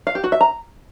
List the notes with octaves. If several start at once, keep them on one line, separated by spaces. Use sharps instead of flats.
F5
G4
F#4
E5
A#5